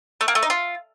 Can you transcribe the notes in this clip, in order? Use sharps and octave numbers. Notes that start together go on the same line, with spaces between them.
A3
A#3
A3
D#4
F4